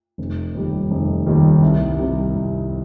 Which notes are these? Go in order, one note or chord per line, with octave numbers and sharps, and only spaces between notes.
F1
D#2 D#3 G3
F1
D#2 D#3 G3
C2
C3 D#3 G3 C4
C2